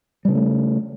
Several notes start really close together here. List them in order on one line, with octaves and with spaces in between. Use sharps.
G3 C#3 B3 A3